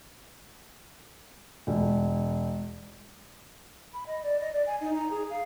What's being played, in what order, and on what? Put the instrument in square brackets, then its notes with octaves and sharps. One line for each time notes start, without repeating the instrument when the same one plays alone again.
[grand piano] E1
[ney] B5
D#5
D5
D#5
D5
G#5
D#4
A#5
G#4
F5